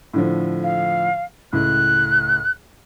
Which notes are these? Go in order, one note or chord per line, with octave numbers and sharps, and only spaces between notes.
A2 D3 F3
F5
C#2 A2 F#6